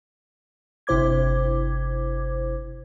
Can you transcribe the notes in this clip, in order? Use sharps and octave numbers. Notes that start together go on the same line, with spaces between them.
G1 C3 E4 C5 D6 G#6